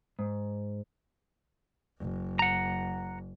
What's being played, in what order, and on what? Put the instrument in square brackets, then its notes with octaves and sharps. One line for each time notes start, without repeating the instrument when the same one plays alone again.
[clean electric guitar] G#2
[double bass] F#1
[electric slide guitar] F#5 A#5